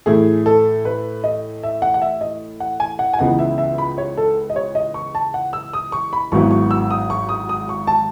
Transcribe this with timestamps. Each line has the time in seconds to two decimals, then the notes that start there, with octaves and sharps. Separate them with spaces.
0.06 A2 E3 A3 E4 G#4
0.46 A4
0.85 B4
1.24 D#5
1.63 E5
1.82 F#5
1.94 F#5
2.02 E5
2.21 D#5
2.60 F#5
2.80 G#5
2.99 F#5
3.13 G#5
3.19 C#2 C#3 E3 B3 D#4 F#5
3.39 E5
3.58 E5
3.78 B5
3.98 C#5
4.17 A4
4.50 D#5
4.56 C#5
4.75 D#5
4.94 C#6
5.15 A5
5.34 F#5
5.53 E6
5.73 D#6
5.92 C#6
6.13 B5
6.32 G#1 G#2 F#3 B3 E4 C#6
6.51 C#6
6.71 E6
6.91 D#6
7.10 C#6
7.29 D#6
7.49 D#6
7.69 C#6
7.87 A5